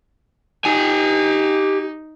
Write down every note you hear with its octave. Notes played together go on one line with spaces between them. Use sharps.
D#4 G4 G#5